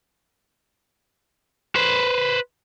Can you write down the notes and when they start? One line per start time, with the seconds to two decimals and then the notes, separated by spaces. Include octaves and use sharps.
1.75 B4 C5